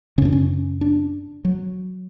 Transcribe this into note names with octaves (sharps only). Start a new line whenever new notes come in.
F#2 C#3 C#4 D4
C#4
D4
F#3